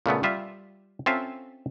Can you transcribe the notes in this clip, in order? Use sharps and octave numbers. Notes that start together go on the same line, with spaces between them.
A#2 C#3 A3 B3
G3 F4 E5
C4 C#4 F4 A4 E5 F5